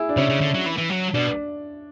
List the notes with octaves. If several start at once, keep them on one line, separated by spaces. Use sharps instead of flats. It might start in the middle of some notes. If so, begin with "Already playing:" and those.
Already playing: E4 G#4
D4
C#3 C#4 E4
C#3
D3
F#3
E3
E3
F#3
B2 D4